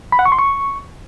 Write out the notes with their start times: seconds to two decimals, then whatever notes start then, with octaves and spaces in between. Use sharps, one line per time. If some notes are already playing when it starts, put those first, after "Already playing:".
0.12 B5
0.19 F#5
0.25 C#6
0.32 C6
0.39 C#6